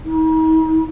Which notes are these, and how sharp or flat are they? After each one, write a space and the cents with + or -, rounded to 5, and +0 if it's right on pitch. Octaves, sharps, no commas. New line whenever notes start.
D#4 +40